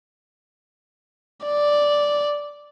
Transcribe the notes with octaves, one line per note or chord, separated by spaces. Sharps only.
D5